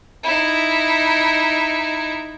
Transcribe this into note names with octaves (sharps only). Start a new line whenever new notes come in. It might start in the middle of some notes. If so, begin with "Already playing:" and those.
D#4 E4